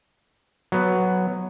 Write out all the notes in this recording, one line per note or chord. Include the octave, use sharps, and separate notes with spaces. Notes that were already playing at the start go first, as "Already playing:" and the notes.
F#3 B3